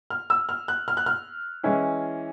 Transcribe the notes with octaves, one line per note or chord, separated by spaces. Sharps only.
F6
E6
F6
F#6
F6
F#6
F6
E3 G#3 C#4 E4